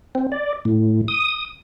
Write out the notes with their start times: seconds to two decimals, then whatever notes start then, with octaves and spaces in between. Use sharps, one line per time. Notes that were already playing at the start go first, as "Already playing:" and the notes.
0.15 C4
0.32 D5
0.65 A2
1.08 D#6